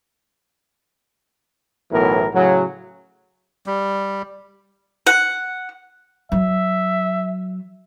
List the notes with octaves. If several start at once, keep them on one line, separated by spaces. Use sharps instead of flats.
B1 A2 E3 B3 A#4
A2 C#3 F#3
G3
F#5
F#3 E5